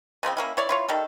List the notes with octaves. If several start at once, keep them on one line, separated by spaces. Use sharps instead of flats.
C#3 F3 A3 C4
A#3 C#4 E4
E4 C#5 D5
E4 F4 C#5
D#3 G3 A4